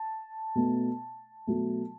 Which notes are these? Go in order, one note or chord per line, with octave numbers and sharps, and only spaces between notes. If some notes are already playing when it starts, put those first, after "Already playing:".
Already playing: A5
B2 A3
B2 F#3 A3